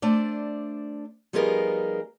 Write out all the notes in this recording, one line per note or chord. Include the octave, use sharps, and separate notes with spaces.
A3 D4 C5 D5
F3 G3 B3 D#4 G#4 A#4